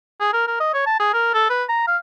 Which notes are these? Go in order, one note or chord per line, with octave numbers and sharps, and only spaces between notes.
G#4
A#4
A#4
D#5
C#5
A5
G#4
A#4
A4
B4
A#5
F5